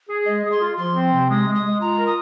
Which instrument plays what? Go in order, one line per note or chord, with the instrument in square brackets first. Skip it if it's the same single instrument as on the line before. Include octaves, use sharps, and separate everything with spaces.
[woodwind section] G#4
[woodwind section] G#3 [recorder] D#5
[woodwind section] G#4
[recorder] C6
[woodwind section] F4
[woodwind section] F3 [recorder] C6
[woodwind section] C4
C3
[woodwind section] G#3 [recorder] D#6
[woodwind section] G#3
[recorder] D#6
[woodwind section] G#3
[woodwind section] F4 [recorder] A#5
[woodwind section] A#4
[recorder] D#6